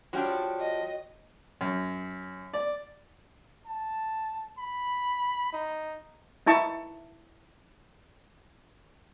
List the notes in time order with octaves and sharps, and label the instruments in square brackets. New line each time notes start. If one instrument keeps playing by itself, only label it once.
[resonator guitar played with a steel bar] F3 G3 D4 [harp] F#4 C#5 G5
[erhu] D#5
[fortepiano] F#2
D5
[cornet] A5
B5
D#4
[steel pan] D#4 E4 A5 C#6